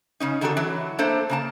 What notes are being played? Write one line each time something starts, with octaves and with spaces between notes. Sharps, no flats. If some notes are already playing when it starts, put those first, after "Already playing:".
C#3 C#4 D#4
D3 D#3 G3 F#4 G#4 A4
E3 F#3
A3 A#3 D4 A4 C5
C#3 A#3 A5